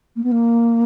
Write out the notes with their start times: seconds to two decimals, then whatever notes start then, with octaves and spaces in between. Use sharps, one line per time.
0.16 A#3
0.23 B3
0.31 A#3